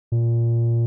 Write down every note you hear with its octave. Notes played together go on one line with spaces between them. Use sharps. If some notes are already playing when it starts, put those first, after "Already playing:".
A#2